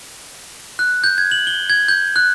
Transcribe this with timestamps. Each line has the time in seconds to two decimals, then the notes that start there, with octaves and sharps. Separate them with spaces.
0.79 F#6
1.04 G6
1.18 G#6
1.31 F#7
1.47 G7
1.70 G#6
1.88 G6
2.16 F#6